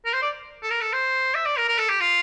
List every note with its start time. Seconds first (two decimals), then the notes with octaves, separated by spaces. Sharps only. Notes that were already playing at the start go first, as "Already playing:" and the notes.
0.05 A#4
0.14 C5
0.22 D5
0.63 A4
0.70 A#4
0.81 A4
0.93 C5
1.35 E5
1.46 D5
1.57 A#4
1.68 A#4
1.78 A4
1.89 G4
2.01 F4